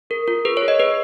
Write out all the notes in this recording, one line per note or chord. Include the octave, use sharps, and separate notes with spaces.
G#4 A#4
F4 A#4
G#4 B4
C#5
G#4
D#5
G#4 B4